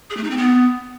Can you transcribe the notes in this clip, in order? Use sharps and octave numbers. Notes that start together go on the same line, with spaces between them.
G#4
A3
D#4
C4
B3